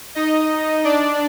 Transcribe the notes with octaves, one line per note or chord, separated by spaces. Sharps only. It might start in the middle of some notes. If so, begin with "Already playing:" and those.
D#4 D#5
D4 D5